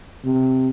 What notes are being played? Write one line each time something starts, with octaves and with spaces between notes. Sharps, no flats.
C3